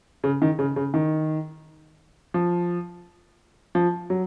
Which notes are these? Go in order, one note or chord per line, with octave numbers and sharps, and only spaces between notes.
C#3
D#3
C#3
C#3
D#3
F3
F3
F#3